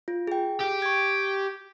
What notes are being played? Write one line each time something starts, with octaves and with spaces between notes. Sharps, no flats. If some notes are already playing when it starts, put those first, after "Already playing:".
F4
G#4 G5
G4
C#6 G#6